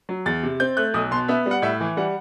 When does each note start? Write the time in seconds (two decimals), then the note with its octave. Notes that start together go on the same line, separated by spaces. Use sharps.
0.09 F#3
0.26 E2 A6
0.43 C3
0.60 C4 G6
0.77 A3 F#6
0.94 B1 D#6
1.11 B2 C6
1.28 B3 E5
1.46 G3
1.51 F#5
1.62 A2 E5
1.81 E3
1.97 G3 F#5